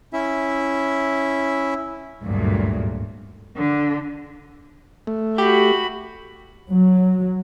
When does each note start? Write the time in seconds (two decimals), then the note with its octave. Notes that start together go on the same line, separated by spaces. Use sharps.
0.13 C#4 E4 E5
2.22 G#1 D2 G2 A#2 F#3
3.57 D3
5.07 A3
5.38 F#4 G4 B5
6.70 F#3